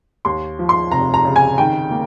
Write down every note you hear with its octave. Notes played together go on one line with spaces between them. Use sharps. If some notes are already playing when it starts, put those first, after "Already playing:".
D#2 C6
F3
C6
F1 A#5
A#5
C#3
G#5
D#3 G5
A#3